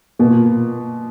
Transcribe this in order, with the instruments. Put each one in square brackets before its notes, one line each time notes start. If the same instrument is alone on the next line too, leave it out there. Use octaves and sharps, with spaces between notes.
[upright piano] B2 [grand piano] A#3
[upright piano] A#2
A#2